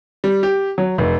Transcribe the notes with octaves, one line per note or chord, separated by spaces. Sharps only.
G3
G4
F#3
F1